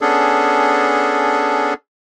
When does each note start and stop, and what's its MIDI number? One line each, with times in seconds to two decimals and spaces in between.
0.01 1.74 59
0.01 1.74 61
0.01 1.74 62
0.01 1.74 68
0.01 1.74 69